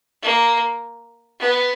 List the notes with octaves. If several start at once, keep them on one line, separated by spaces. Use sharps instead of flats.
A#3
B3